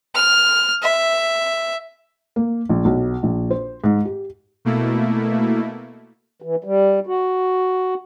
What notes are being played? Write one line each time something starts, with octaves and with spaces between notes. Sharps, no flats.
F6
E5
A#3
A#1
B1
A#1
C5
G#2
G4
B2 A3 A#3 E4
E3
G3
F#4